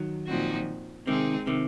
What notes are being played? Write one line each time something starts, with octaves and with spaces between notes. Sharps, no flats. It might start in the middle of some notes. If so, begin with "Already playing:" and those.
Already playing: D#3 F#3
A#2 F3 C4 D#4 F#4
C3 D#3 G#3 C4 D#4 G#4
C3 D#3